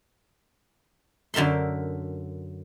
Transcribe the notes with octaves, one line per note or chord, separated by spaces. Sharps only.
F#2 D3 A#4 E5 C6